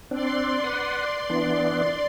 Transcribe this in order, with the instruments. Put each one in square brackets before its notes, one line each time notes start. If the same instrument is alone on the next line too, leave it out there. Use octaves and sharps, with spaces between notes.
[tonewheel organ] C4 D4 [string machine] D5 C6
[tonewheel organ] B4 F#5
E3 B3 D4